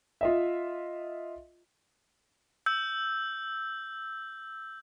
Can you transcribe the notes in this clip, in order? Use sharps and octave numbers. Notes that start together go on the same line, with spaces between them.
F4 D#5 E5
E6 G6